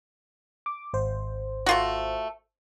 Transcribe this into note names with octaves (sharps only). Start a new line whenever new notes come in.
D6
G#1 C5
A3 F4 F#4